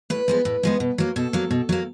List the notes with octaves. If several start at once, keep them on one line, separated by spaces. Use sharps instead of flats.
A2 B4
F3 G#3 B3
A2
F3 G#3 B3
B2
F#3 A#3
B2 A4
F#3 A#3
B2
F#3 A#3